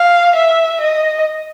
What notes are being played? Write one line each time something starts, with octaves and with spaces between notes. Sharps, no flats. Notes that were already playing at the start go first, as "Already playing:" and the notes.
Already playing: F5
E5
D#5